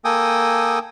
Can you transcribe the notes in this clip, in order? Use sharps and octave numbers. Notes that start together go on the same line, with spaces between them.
A#3 A4 G5 G#5 D#6